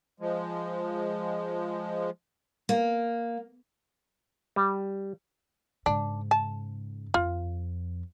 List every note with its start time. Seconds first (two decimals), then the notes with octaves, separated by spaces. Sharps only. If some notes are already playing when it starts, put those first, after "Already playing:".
0.20 F3 G#3
2.69 A#3
4.56 G3
5.86 G#2 C#3 D4
6.31 A5
7.14 F2 F4